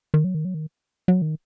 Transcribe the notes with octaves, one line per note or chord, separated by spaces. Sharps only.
D#3
F#3
D#3
F#3
D#3
F#3
D#3